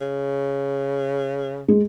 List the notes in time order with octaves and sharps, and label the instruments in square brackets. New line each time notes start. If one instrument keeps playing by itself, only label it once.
[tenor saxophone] C#3
[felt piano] G#3